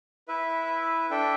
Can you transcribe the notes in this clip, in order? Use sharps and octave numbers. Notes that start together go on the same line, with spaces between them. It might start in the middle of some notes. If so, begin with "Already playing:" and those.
E4 B4 E5
D4 A4 E5 G5